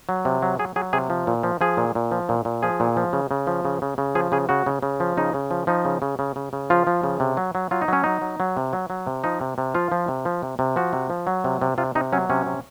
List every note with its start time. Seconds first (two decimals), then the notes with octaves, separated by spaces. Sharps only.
0.09 F#3
0.25 C3
0.42 F#3
0.59 F#3 G#4
0.76 F#3 G#4
0.93 C3 G#4
1.10 F3
1.27 A#2
1.43 F3
1.61 F3 G#4
1.77 A#2
1.95 A#2
2.11 F3
2.29 A#2
2.45 A#2
2.63 F3 G#4
2.80 A#2
2.97 F3
3.13 C#3
3.31 C#3
3.47 F3
3.65 C#3
3.82 C#3
3.98 C#3
4.15 F3 G#4
4.32 C#3 G#4
4.49 C#3 F#4
4.66 C#3
4.83 C#3
5.00 F3
5.17 C#3 D#4
5.34 C#3
5.51 F3
5.67 F3 D#4
5.85 C#3
6.02 C#3
6.19 C#3
6.36 C#3
6.53 C#3
6.70 F3 F4
6.87 F3
7.03 C#3
7.20 C3
7.37 F#3
7.55 F#3
7.71 F#3 F4
7.82 D#4
7.88 F#3 C#4
8.04 F#3 D#4
8.22 F#3
8.40 F#3
8.57 C3
8.73 F#3
8.90 F#3
9.07 C3
9.24 F3 D#4
9.41 C3
9.58 C3
9.75 F3 F4
9.92 F3
10.08 C3
10.25 F3
10.43 C3
10.59 C3
10.76 F3 F#4
10.93 C3
11.10 F3
11.27 F#3
11.44 C3
11.61 C3
11.78 C3 F4
11.95 C3 D#4
12.12 F#3 C#4
12.30 C3 C#4
12.46 C3